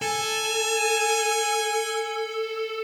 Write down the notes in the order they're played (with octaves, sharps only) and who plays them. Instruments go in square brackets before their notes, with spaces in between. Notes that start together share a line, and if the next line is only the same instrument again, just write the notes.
[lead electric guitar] A4 [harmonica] G#5